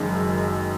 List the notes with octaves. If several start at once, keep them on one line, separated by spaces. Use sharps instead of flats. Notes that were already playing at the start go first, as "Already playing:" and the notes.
Already playing: F#1 F#2 D#3 G#3